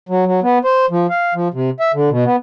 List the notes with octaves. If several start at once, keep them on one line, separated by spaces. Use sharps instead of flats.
F#3
F#3
B3
C5
F3
F5
F3
C3
E5
D3
B2
B3